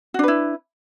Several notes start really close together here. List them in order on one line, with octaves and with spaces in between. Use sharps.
F#4 D4 B4 E4